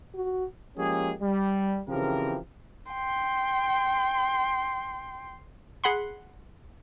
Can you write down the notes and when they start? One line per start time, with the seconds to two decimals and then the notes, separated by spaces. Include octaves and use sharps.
0.15 F#4
0.77 F3 G#3 A#3 C#4 G4 G#4
1.21 G3
1.88 C#3 E3 F3 C4 G4 A#4
2.91 G5 C6
5.84 G#4 F#5 B5 C6